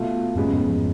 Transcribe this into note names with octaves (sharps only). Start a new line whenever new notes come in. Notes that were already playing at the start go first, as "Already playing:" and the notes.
Already playing: B2 A3 F4
F#2 A2 C#3 G#3 B3
F#2 A2
F2 G#2